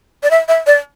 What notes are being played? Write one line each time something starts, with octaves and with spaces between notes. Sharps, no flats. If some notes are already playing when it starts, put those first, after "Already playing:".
D5
E5
E5
D5